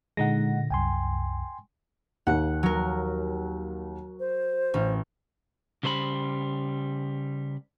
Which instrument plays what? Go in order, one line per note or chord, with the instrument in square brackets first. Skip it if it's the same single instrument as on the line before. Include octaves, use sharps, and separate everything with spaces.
[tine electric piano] A#2 D3 A#6 [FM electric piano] G#3 D#4 F#5
[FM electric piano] C2 F#2 [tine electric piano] G5 G#5 C6
[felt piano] D#2 [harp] F#5
[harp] F#3 A#4
[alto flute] C5
[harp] A1
[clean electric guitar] C#3 G3 C5 D#5 B5